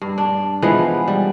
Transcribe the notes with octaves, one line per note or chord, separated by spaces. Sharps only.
G2
D4
E3 F3 G#3 B3
G3